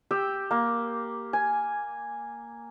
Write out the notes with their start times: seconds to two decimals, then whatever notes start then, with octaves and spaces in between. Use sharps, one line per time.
0.11 G4 G5 E6
0.51 A#3
1.33 G#5